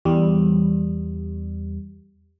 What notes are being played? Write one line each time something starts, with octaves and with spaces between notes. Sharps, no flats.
E2 G3